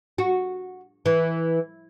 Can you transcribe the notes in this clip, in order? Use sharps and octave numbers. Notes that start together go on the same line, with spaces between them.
F#4
E3